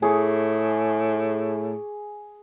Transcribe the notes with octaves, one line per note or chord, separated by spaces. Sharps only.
A2 G#4 C#6 D6